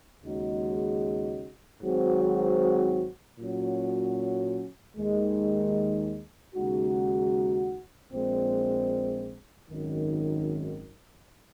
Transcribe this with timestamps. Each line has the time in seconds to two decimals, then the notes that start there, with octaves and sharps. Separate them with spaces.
0.25 D#2 C#3 G#3 D#4 F#4
1.82 G#1 G#2 F#3 C4 F#4
3.39 A#2 F#3 C#4 F#4
4.97 D#2 D#3 G#3
6.55 D#2 C#3 G#3 D#4 F#4
8.12 A#1 A#2 G#3 C4
9.70 G#1 F#2 D#3